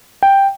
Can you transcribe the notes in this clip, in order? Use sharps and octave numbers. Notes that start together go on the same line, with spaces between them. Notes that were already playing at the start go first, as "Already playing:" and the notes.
G5